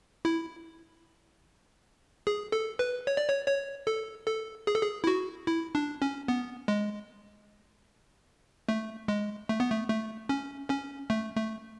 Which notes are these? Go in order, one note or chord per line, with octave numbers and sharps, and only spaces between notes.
E4
G#4
A4
B4
C#5
D5
C#5
C#5
A4
A4
G#4
A4
G#4
E4
F#4
E4
D4
C#4
B3
G#3
A3
G#3
A3
B3
A3
A3
C#4
C#4
A3
A3